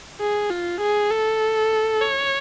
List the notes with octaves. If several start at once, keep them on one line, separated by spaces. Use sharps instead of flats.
G#4
F4
G#4
A4
C#5